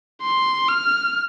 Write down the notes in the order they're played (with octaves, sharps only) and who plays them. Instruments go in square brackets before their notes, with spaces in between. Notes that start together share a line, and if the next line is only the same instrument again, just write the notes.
[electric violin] C6
F6